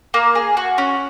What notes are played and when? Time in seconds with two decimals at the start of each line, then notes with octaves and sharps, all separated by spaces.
0.14 A#3
0.35 G#4
0.57 F#4
0.78 C#4